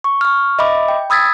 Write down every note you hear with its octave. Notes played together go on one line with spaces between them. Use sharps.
C#6
C#6 F6
D#5 E5 B5 D6
G5
B5 D#6 E6 G#6 A6 B6